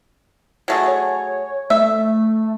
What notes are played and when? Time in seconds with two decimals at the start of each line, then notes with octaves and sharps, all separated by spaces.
0.68 F#3 A3 G#4
0.88 C#5
1.70 A3 E5